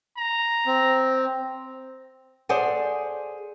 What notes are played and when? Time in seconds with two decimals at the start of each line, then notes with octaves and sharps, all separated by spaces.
0.17 A#5
0.66 C4
2.49 G#4 A4 C5 D5 F#5 G#5